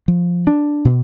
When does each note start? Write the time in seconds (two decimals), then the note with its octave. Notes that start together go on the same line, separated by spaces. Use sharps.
0.08 F3
0.47 D4
0.85 B2